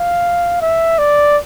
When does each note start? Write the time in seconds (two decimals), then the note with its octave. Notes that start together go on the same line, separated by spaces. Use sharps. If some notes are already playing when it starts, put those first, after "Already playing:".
Already playing: F5
0.61 E5
0.98 D5